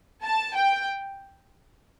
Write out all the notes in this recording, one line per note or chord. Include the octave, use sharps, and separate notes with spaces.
A5
G5